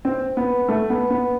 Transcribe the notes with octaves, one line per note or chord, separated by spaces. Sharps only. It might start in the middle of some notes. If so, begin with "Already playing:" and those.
C4
B3
A3
B3
B3